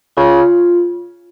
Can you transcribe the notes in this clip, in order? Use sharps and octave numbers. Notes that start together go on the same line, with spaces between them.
C#3 F4